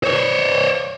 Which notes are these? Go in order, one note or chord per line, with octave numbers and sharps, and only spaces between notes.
C5 C#5